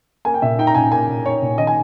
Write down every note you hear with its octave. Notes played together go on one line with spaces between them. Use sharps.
A#3 G#5
G5
A#2 E5
D#4 G5
A#5
A#2 G#5
A#3 G#5
A#2
D#4 C#5
A#2
D#3 D#5
G#5